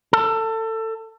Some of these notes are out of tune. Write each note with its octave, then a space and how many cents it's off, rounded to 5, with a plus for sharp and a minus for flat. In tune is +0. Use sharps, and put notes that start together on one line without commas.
A4 +25